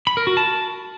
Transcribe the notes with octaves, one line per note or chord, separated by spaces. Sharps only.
B5
A#4
F#4
A5